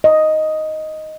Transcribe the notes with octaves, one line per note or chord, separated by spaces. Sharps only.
D#5